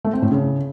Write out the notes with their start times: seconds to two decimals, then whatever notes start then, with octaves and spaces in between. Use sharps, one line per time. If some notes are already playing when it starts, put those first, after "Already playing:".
0.05 A3
0.13 C4
0.22 A2
0.31 C#3